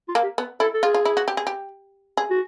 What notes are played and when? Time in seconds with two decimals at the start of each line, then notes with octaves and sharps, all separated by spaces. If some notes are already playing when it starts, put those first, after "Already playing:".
0.08 F4
0.15 A#3
0.23 G4
0.38 B3
0.60 E4 A4
0.74 A4
0.83 F4 G#4
0.94 F4
1.05 E4
1.17 F#4
1.28 G4
1.37 G#4
1.47 G4
2.17 G#4
2.30 F#4